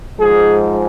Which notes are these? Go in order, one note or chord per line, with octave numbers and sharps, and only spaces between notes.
G#2 F3 G#3 G#4